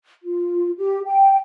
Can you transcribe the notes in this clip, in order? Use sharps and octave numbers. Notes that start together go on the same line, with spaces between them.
F4
G4
G5